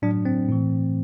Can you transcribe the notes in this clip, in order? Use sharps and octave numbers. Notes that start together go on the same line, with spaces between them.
A2 F#3 D4
C4
A2 E3